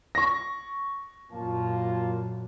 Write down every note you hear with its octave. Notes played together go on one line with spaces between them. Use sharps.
C#6 A#6
F#2 A#2 A#3 F4 A5